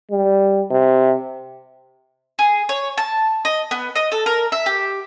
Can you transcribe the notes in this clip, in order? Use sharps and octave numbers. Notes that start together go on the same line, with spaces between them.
G3
C3
G#4
C#5
A5
D#5
B3
D#5
A4
A#4
E5
G4